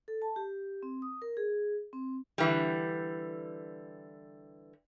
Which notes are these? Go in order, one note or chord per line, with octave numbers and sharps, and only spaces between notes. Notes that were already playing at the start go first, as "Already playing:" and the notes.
A4
A5
G4
C4
D#6
A#4
G#4
C4
D3 E3 G3